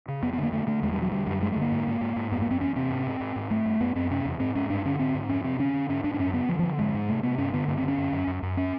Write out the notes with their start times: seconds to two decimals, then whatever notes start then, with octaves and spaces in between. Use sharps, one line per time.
0.08 C#3
0.22 F2 B3
0.33 B3
0.38 D3 A#3
0.52 D3 A3
0.67 D3 A3
0.83 E2 G#3
0.92 G3
0.98 B2 F#3
1.12 D3 G3
1.27 F#2 G3
1.42 G2 G#3
1.52 A3
1.56 D3
1.61 A#3
1.72 G#2
1.87 G#2
2.01 G#2
2.16 G#2
2.32 F#2 B3
2.42 A#3
2.46 F#2 C4
2.61 E2 C#4
2.76 C3 C4
2.91 G#2
3.06 G#2
3.20 G#2
3.36 G#2
3.51 G2 A3
3.66 G2
3.80 F#2 B3
3.95 F#2 C4
4.11 C3 C#4
4.25 E2
4.40 G#2 C4
4.55 G#2 C#4
4.70 G2 D4
4.85 D3 C#4
4.99 G#2 C4
5.14 G#2
5.29 F2 C#4
5.44 C3 C4
5.59 D3 C#4
5.74 D3
5.89 G#2 C#4
6.04 G#2 D4
6.14 D4
6.19 F#2 C#4
6.33 C#3 B3
6.49 D3 F3
6.59 D3 F3
6.79 G#2 G#3
6.94 G#2
7.09 C3 A3
7.23 C3 B3
7.38 G2 C#4
7.53 D3 B3
7.68 G2 A#3
7.78 D3 C4
7.88 C#4
7.98 F#2
8.12 F#2
8.27 F#2
8.43 F#2
8.57 C#4